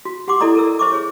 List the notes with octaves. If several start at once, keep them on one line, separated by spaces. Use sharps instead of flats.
F#4
G4 F#5 C6 D6
E4 A4 D5 D#5 A#5 D#6
A4 A#4 E6
C5 E5 C#6 D6
G#4 C#5